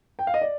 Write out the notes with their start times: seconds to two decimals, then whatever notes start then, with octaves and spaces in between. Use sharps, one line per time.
0.19 G5
0.27 F5
0.34 D#5
0.42 D5